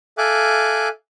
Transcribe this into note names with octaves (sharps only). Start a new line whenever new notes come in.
A4 E5 F5 G#5 D6 F#6